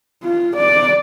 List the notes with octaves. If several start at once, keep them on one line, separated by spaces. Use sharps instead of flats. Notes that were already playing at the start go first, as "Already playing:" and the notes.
F4
D5